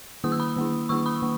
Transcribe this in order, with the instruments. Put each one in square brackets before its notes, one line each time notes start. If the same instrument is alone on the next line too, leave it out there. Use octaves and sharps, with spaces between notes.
[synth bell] D#3 A#3 E4 D#6
E6
B5 D#6
D#3 A#3 E4
D#3 A#3 E4 C#6 E6
B5 D#6
D#3 A#3